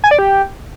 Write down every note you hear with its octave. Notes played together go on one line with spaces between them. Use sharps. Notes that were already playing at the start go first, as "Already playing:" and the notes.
G#5
D5
G4